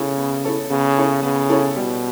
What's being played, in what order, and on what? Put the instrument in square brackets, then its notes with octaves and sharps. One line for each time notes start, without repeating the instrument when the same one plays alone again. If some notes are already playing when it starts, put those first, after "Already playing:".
Already playing: [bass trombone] C#3 [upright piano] B3 E4 A4 C#5
[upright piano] B3
E4 A4 C#5
[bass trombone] C#3 [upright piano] B3
[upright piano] E4 A4 C#5
[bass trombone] C#3 [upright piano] B3
[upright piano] E4 A4 C#5
[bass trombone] B2 [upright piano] G3